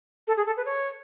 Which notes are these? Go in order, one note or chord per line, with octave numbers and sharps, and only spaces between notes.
A4
G#4
A4
B4
C#5